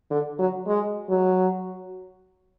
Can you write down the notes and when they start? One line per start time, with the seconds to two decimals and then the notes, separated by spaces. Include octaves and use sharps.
0.11 D3
0.39 F#3
0.67 G#3
1.09 F#3